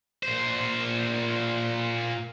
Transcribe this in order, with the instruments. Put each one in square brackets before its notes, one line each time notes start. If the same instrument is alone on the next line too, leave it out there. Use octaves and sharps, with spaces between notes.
[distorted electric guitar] A#2 C5